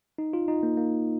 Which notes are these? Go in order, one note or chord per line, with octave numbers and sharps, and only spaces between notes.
D#4
F4
D#4
A#3
A#3